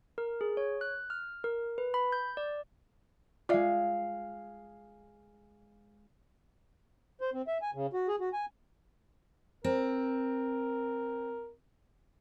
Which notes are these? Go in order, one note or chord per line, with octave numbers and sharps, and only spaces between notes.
A#4
G#4
C#5
F#6
F6
A#4
B4
B5
G6
D5
G#3 F4 D5 E5 F5
C5
C4
E5
G#5
C#3
F#4
G#4
F#4
G#5
C4 A#4